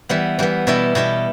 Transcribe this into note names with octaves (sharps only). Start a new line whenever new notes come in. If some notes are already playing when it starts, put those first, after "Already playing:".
E3 G3 B3
E3 G3 B3
B2 G3 E4 A4
B2 G3 E4 A4